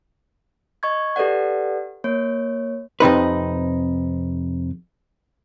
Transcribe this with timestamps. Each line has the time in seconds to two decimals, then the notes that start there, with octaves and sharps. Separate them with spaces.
0.83 D#5 C#6 G#6
1.16 G4 A4 B4 D5 F#5
2.04 A#3 C#5
3.00 F2 C3 D#4 B4